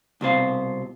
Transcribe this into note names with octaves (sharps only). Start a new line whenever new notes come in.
C2 B2 C4 F5